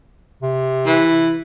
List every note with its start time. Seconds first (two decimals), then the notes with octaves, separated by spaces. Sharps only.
0.43 C3
0.86 E3